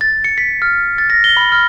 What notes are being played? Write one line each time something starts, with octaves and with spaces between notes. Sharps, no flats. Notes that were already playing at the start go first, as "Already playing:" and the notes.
A6
C#7
B6
F6
A6
A#6
G7
B5
F6